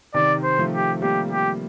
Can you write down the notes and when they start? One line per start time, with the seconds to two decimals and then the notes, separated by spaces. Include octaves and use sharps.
0.14 C3 D#3 D5
0.44 C5
0.58 F3 A3
0.73 G4
1.02 G3 A#3 G4
1.31 G4